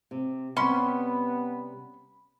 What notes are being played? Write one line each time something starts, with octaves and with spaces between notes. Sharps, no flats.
C3
C3 G3 B3 C#4 B5 C6